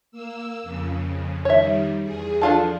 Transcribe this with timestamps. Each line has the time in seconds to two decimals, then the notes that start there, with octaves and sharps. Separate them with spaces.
0.12 A#3 E6
0.63 F2 C#3
1.45 D#3 G3 C#5 E5
2.02 E2 G#4
2.41 F3 D4 F4 A4